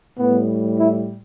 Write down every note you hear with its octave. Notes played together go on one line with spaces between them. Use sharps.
A2 G3 B3
E4